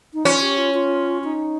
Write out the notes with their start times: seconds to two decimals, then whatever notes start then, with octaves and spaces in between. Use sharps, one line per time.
0.14 D#4
0.25 C#4 F4
0.42 G4
0.58 F4
0.74 F4
1.24 D#4